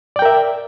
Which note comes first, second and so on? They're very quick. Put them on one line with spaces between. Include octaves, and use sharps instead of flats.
D5 G5 A#4 E5